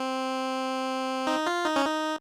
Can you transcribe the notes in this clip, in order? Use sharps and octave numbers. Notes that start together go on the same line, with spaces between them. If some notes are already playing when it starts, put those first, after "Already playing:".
Already playing: C4
D#4
F4
D#4
C#4
D#4